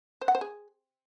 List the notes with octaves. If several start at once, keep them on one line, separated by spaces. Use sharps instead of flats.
C5
F#5
C5
G#4